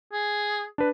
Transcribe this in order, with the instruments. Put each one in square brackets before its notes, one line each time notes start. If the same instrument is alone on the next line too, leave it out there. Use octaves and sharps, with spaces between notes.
[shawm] G#4
[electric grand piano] D4 B4